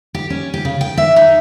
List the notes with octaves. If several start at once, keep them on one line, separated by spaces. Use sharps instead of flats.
G4
C#4
G4
C#3
G5
E5
D#4